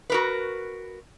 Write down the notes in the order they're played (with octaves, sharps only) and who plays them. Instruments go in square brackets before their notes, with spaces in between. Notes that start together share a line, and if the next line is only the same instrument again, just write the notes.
[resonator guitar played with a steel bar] F#4 A#4 B4